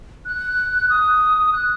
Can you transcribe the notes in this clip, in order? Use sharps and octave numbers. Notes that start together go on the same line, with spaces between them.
F#6
D#6
F#6